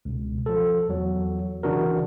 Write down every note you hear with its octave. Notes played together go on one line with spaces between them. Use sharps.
C#2 B2
F3 A4
E2 F#3
C#3 E3 D4 F#4 A#4